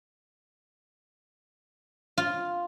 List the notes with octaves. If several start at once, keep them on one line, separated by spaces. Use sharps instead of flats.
F4